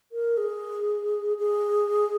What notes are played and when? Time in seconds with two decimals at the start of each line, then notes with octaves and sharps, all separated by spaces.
0.12 A#4
0.37 G#4
1.38 G#4